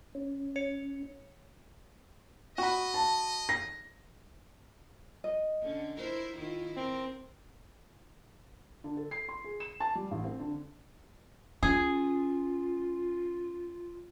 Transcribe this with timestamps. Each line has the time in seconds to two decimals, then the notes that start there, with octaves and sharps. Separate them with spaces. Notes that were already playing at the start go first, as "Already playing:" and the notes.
0.15 C#4
0.56 C#5 C#7
2.58 F#4 D#5 B5
2.94 A5
3.49 A#6
5.24 D#5
5.61 D3 C#4
5.97 E4 A#4 C5
6.37 D#3 E4 F4
6.77 C4 A#4
8.84 D3
8.97 A4
9.11 C7
9.29 C6
9.44 G#4
9.60 E7
9.80 A5
9.95 G3
10.11 A1
10.24 C4
10.39 D3
11.63 C#4 F4 G#4